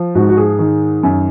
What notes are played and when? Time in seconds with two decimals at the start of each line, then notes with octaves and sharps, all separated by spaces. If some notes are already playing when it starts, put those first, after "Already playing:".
Already playing: F3
0.15 G#2 F#4
0.29 F#4
0.37 G#4
0.59 D#3
1.03 F#2